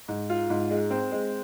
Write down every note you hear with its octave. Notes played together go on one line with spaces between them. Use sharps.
G#2
F4
G#2
G#3
C4
G#3